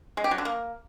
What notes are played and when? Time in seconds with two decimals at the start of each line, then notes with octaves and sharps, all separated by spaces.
0.17 G#3
0.24 G4
0.31 F#3
0.38 D3
0.45 A#3